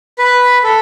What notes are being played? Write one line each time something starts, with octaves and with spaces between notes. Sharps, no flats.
B4
A4